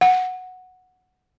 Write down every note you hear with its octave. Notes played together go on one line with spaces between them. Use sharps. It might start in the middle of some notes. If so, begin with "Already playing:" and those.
F#5